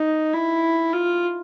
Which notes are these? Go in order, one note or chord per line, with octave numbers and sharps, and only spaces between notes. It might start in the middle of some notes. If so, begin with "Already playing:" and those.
Already playing: D#4
E4
F4